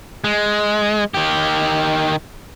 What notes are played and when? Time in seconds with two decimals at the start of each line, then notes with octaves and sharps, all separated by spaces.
0.24 G#3
1.14 D#3 G4